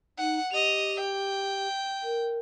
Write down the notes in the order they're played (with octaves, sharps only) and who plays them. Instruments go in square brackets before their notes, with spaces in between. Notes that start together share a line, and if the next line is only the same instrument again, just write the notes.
[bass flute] D#4 [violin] F#5
[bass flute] G4 [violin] D#5 F7
[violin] G5
[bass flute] A#4